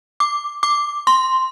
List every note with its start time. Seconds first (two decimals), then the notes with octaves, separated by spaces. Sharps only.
0.20 D6
0.63 D6
1.07 C6